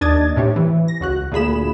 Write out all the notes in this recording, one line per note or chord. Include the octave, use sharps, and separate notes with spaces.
D#2 D4 D#5 G#6 A6
A2 C3 G4 C#5
E3
A#6
C#2 F#4 F#6
D2 A#2 G#4 B5 E7